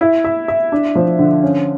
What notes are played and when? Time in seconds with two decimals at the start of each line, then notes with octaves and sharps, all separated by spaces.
0.01 E4
0.24 E5
0.48 E5
0.72 D4
0.95 F3
1.19 D3
1.42 C#4